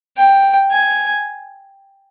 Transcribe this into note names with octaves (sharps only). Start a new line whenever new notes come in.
G5
G#5